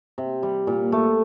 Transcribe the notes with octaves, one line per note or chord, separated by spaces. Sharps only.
C3
G3
A#2
A3